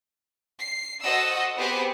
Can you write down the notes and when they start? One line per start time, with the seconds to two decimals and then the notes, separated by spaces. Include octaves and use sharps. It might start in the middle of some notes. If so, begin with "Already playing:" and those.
0.60 C7
1.02 F#4 A4 C5 D#5 F#5 E6
1.57 B3 C4 G4 G#4 B4 C5